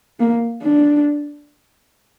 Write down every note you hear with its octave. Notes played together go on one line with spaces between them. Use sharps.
A#3
D4